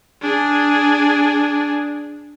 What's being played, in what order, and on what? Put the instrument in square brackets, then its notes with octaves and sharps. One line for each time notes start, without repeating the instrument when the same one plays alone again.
[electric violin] D4 G#4